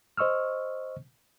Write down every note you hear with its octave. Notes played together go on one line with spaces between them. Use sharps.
C5 D#5 C#6 E6 F6